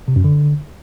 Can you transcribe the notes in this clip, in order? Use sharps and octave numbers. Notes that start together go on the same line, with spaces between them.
C3
F#2
D3